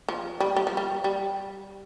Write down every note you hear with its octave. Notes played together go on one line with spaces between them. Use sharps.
F3
G3
G3
F3
G3
G3